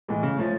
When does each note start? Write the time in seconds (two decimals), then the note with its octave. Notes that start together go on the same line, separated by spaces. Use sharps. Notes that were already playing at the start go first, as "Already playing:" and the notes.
0.08 A2 E3 G#3
0.23 C#3
0.38 F3 A3 C#4